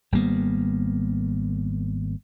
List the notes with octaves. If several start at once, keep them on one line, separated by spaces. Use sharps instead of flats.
G#1 G3 A#3 B3